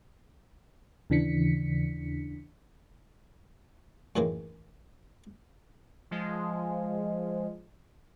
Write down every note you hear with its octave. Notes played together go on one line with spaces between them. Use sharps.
D#2 C#3 E3 D4 B6 C#7
F#2 A2 D#3 E3 G#3 A#3
F3 G#3